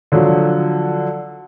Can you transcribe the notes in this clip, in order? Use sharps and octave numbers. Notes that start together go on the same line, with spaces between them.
D3 F3 F#3